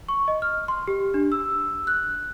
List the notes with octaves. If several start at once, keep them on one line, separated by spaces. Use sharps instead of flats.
C#6
D#5
F6
C6
G4
D4
E6
F#6